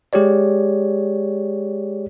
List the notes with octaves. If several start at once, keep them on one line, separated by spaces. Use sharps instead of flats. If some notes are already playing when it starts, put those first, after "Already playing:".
G#3 G4 G#4 C#5 D5